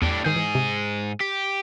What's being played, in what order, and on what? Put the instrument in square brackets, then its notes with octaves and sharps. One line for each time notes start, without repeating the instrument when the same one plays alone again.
[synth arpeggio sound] E2 [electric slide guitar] A2 D4 G4
[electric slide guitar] G#2 G#4 [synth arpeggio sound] D#3 G6
[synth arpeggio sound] E3
C3
[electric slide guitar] G4 [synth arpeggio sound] B6